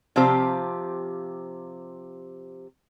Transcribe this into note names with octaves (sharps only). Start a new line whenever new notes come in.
C3 F3 C4 F4 G4 C5